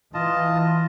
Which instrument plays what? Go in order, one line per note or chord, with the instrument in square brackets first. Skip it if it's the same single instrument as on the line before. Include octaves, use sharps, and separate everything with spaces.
[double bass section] E3 [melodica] F4 D#5 A5